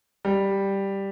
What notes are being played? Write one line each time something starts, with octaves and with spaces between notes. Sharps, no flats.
G3